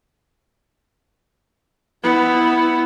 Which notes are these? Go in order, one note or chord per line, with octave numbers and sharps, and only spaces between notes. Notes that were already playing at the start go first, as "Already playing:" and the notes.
B3 E4